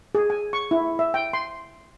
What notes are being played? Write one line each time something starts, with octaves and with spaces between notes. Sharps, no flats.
G#4
G#5
C#6
E4
E5
G5
C6